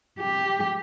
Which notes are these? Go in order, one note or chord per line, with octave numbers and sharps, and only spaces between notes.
G4